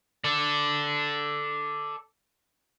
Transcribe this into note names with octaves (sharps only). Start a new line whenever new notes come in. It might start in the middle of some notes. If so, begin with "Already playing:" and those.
A4 D5